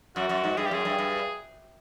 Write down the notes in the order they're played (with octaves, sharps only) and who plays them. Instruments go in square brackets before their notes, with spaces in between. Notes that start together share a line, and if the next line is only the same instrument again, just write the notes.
[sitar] F#2 [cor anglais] F#4
[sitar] F#2
G#2
[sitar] G2 [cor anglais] G#4
[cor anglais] G4
[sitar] F#2 [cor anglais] G#4
[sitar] G2
G2